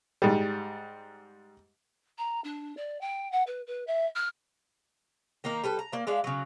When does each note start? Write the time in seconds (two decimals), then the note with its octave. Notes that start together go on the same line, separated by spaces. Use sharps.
0.22 G#2 G3
2.18 A#5
2.44 D4
2.77 D5
3.01 G5
3.32 F#5
3.46 B4
3.67 B4
3.87 E5
4.15 F6
5.44 D#3 A#3 D#4 A#4
5.64 G3 A4 B4
5.79 A#5
5.92 A#3 D5
6.07 G#3 D4 E5 F5
6.24 C#3 F#3